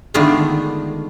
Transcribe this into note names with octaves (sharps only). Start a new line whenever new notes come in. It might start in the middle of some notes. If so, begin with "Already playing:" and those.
D3 D#3 G#3 A3 B3 F4